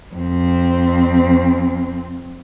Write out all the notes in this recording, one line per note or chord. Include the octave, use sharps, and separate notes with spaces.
F2 C4